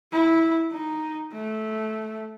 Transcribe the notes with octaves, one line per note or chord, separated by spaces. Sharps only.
E4
D#4
A3